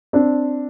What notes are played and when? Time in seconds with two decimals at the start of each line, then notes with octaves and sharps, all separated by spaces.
0.13 C4 D4